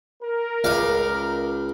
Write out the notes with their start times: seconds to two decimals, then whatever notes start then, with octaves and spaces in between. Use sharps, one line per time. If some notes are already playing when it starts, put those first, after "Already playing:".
0.22 A#4
0.64 C#2 F5